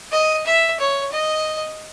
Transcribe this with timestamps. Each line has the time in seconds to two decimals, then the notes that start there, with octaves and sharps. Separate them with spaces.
0.12 D#5
0.46 E5
0.79 C#5
1.12 D#5